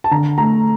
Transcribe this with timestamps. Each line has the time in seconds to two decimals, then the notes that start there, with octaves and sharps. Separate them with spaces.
0.04 A5
0.11 D3 A#5
0.38 A3 A#5